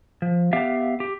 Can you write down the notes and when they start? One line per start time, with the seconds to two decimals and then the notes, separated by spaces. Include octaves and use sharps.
0.22 F3
0.53 B3 G4 E5 F5
1.00 G4